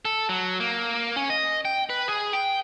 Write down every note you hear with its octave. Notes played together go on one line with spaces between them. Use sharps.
A4
F#3
A#3
C#4
D#5
G5
B4
G#4
G5